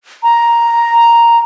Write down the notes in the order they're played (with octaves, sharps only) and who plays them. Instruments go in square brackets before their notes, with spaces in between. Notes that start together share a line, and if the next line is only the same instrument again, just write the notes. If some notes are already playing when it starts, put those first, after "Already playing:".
[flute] A#5